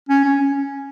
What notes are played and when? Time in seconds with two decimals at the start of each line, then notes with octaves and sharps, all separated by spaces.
0.09 C#4
0.25 C#4